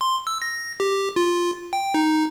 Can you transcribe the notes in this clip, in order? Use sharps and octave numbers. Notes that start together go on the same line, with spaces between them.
C6
E6
A#6
G4
F4
G5
D#4